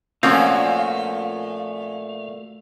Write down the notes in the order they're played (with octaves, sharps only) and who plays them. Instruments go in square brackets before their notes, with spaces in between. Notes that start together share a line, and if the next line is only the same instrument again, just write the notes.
[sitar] A#2 F#4 [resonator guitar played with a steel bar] F3 A#3 C#4 [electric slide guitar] A3 F5 [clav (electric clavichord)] C4